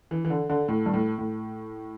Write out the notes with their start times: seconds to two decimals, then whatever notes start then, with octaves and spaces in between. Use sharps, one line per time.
0.11 E3
0.25 E3
0.30 D3
0.50 D3
0.68 A2
0.86 G2
0.94 A2
1.19 A2